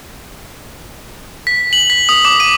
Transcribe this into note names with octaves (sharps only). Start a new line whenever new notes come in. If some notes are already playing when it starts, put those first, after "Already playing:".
B6
F#7
B6
D#6
D6
D#7